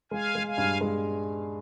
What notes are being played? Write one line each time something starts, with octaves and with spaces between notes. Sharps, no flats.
G#3 F5 G#5
G#3
F5 G#5
G2
G#3